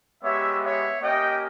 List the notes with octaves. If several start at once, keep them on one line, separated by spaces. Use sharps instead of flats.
G#3 B3 G4 C#5 E5
C#5 E5
A#3 C#4 G4 D#5 G5